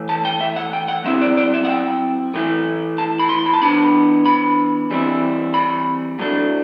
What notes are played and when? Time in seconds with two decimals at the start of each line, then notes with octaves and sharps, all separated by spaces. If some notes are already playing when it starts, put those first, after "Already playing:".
Already playing: E3 A3 E4
0.09 A5
0.25 G5
0.41 E5
0.56 F#5
0.73 G5
0.88 F#5
1.04 F#3 C4 E4 E5
1.22 D5
1.37 D5
1.54 E5
1.65 F#5
1.69 G5
2.34 A2 E3 A3 E4
2.98 A5
3.19 B5
3.29 C6
3.46 B5
3.54 A5
3.62 E3 B3 D4 B5
4.26 B5
4.90 E3 G3 C4 E4
5.54 B5
6.19 A2 F#3 A3 D4